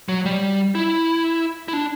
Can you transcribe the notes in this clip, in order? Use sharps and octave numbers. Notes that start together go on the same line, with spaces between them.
F#3
G3
E4
E4
D4